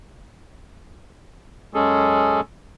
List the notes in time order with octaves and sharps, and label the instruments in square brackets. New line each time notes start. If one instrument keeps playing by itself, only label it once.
[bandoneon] F#2 G#3 C#4 G#4 A4